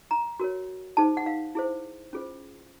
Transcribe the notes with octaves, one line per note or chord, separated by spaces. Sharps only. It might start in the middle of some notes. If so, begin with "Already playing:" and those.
A#5
F#4 A#4 C#5
D#4 G#4 C5 A5
F#5
F5
E4 G#4 C5
C#4 F4 G#4 C5